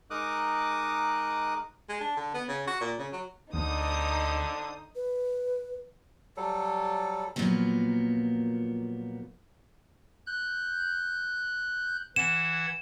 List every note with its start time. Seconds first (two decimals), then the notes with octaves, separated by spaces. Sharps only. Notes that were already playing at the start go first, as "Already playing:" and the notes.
0.10 G#3 D#4 A#4 D6 D#6 F#6
1.89 G#3
2.01 D4
2.16 D3
2.34 B3
2.48 C#3
2.67 F#4
2.81 A#2
2.99 C#3
3.12 F#3
3.53 D2 D3 D#4 C5 D#6
4.95 B4
6.37 F#3 G3 A4
7.36 A#2 F3 F#3 A#3 B3
10.27 F#6 G6
12.16 E3 F#5 G#6 E7